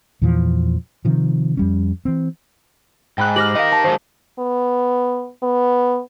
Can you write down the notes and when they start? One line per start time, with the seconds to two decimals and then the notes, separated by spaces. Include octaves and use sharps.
0.22 E2 A#2 E3 F3
1.05 C3 D#3 F3
1.57 F2 G3 C#4
2.05 E3 C4
3.18 G#2 G5 B5 F#6
3.36 G4 C5 F6 A#6 F#7
3.55 D#4 A#4 D#5 F5
3.72 A5
3.84 D#3 F#3 G#3 C5
4.39 B3
5.43 B3